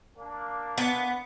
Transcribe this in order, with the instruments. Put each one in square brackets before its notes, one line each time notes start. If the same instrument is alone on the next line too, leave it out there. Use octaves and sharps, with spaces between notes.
[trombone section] A#3 D4
[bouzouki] B3